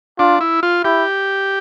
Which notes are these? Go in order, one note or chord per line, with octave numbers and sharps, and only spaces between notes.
D4 F4
E4
F4
E4 G4